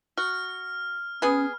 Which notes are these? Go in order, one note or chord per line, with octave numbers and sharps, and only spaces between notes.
F#4 F6
B3 C#4 G#4